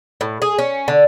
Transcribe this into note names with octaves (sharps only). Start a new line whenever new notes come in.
A2
G#4
C#4
D3